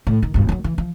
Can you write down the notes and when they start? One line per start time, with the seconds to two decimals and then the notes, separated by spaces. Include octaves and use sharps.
0.07 A2
0.23 D#3
0.34 E1 G2
0.49 D#3 F#3
0.64 E3
0.78 F3